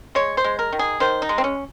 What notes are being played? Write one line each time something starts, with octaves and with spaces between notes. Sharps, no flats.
G#3 C#5
C5
G#3
A#4
D#3
G#4
D#3 C5
D#4
G#3
C4
C#4